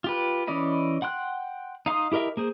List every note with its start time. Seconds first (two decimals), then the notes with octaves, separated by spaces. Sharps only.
0.04 F4 G4 B4
0.47 E3 C#4 D5 D#5 B5
1.02 F#5 G5 C6 F#6
1.86 D#4 F5 C6 D#6
2.12 E4 G4 A#4 D#5 E5
2.37 A#3 G#4 C5